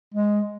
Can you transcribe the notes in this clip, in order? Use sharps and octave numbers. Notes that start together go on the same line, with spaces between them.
G#3